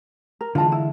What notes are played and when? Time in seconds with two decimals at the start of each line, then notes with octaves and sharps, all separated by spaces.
0.41 A#4
0.55 D3 E3 G#3 F4 A5
0.72 E4